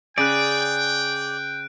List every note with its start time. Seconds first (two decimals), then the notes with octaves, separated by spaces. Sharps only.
0.18 C#3 G#4 D5 G5 F#6 D7